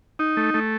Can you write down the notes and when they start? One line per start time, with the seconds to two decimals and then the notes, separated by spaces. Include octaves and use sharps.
0.19 D#4
0.37 A3
0.54 A3